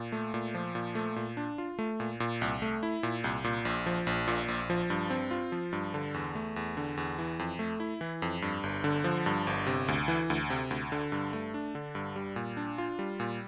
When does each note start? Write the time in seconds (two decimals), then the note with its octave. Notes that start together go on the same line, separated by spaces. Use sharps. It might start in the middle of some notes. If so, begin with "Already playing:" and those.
Already playing: A#2
0.12 A3
0.34 A#2
0.54 F3
0.75 A#2
0.95 A3
1.16 A#2
1.37 D4
1.58 F4
1.79 A3
2.00 A#2
2.20 A#2
2.42 C2
2.62 A3
2.83 E4
3.03 A#2
3.24 C2
3.44 A#2
3.65 A#1
3.86 F3
4.07 A#1
4.28 A#2
4.48 A#1
4.70 F3
4.90 G2
5.10 C4
5.31 F4
5.52 F3
5.73 G2
5.94 D3
6.14 E2
6.35 A3
6.56 E2
6.77 D3
6.97 E2
7.19 E3
7.39 F2
7.59 A3
7.80 E4
8.01 E3
8.22 F2
8.42 G2
8.63 G1
8.84 D3
9.04 F3
9.26 G2
9.47 G1
9.66 C3
9.88 D2
10.08 E3
10.30 D2
10.50 C3
10.71 D2
10.92 D3
11.12 G2
11.33 A3
11.54 D4
11.75 D3
11.95 G2
12.16 G3
12.36 A#2
12.57 D4
12.78 F4
12.99 G3
13.20 A#2